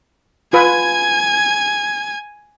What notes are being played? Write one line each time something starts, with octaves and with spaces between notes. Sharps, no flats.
F4 B4 G#5 G#6